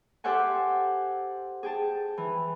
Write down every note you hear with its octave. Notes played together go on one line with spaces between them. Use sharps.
G4 A4 C5 E5 F#5 G#5
G#4 G5 A5
E3